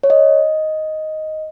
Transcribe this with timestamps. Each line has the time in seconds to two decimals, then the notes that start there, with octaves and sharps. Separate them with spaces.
0.03 C#5
0.10 D#5